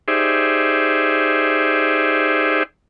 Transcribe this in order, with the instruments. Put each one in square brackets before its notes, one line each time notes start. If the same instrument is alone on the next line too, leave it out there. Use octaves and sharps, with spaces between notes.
[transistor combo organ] D#4 G4 G#4 C5 D5 E5